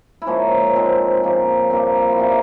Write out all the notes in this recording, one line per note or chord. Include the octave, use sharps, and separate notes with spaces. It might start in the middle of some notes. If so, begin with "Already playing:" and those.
E4
G#2 F3 A#3 C#4
G#2 F3 G#3 C4
C#3 F3 A#3
G2 F3 A#3 C4
E4
C3 G3 A#3 C#4